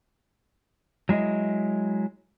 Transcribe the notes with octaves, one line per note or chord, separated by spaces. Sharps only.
F#3 G#3 E4 D#5